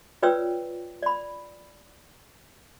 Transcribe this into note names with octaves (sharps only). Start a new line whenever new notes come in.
F4 B4 C#5 D5 G5 E6
D5 B5